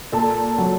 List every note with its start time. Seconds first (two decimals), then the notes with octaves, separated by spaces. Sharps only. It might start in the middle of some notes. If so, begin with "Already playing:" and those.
0.12 A#2 A4 A5
0.58 F#3